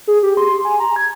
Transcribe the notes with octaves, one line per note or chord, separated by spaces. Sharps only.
G#4
G4
C6
G#5
A#5
G#6